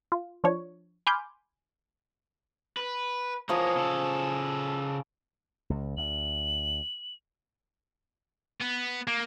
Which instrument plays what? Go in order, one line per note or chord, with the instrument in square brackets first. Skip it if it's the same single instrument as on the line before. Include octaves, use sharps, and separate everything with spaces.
[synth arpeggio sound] F4
F3 D4 C#5
G#5 B5 C6 D6 F6 G6
[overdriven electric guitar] B4
[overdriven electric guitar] E3 A#3 [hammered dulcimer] F3 G#4 C#5
[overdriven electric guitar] C#3 A4
[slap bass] C#2
[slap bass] D2 [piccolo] F#7
[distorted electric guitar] B3
A#3